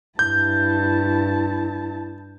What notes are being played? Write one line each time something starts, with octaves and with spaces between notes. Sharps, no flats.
G2 E4 A5 G6